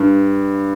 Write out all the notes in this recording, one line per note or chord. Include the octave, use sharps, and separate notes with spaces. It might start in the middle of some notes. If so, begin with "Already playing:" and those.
Already playing: G2